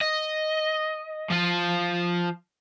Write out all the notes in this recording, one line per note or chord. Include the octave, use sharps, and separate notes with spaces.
D#5
F3 F4